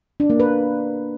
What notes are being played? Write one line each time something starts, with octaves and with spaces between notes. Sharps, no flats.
D4
A#3
B4